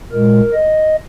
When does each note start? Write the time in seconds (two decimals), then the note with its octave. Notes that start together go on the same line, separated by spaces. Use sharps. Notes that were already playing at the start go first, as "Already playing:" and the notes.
0.12 A#2 G#3 A#4
0.53 D#5